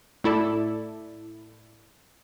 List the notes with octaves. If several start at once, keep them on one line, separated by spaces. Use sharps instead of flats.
A2 E4 A4 D5